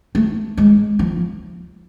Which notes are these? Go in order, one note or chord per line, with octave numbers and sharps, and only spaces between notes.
A3
G#3
F3